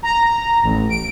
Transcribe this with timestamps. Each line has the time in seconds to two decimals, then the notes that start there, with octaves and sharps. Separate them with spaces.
0.03 A#5
0.63 A1
0.90 D7